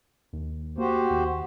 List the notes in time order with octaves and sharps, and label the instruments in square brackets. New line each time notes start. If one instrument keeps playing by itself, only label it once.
[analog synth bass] D#2
[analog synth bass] A#3 [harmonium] F#4 G4 C5
[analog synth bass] D#2